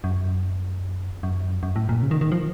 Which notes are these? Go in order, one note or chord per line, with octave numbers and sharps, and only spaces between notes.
F#2
F#2
F#2
A2
A#2
C#3
D#3
D#3
F3